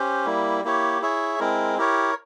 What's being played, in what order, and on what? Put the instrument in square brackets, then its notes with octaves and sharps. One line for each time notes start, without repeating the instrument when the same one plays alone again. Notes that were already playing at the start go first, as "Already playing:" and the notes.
Already playing: [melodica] C#4 G4 C5
G3 A#3 E4
A#3 E4 G4 C#5
E4 G#4 C#5 E5
G#3 C4 E4 A#4
E4 G4 A#4 C#5